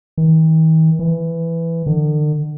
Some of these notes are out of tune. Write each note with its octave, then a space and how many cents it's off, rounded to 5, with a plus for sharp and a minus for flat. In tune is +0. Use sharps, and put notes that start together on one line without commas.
D#3 +45
E3 +10
D3 +40